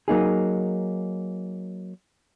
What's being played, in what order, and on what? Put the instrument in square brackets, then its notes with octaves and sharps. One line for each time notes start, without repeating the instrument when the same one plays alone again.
[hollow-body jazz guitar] F#3 A#3 D#4 G#4